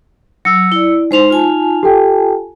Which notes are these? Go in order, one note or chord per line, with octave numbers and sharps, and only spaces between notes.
F#3 E6 C#7
E4 D5
G#3 D#4 C5 C6 F7
F4 G#5 A5
G4 A4 G5